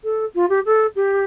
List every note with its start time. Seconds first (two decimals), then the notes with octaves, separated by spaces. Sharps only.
0.03 A4
0.35 F4
0.49 G4
0.65 A4
0.95 G4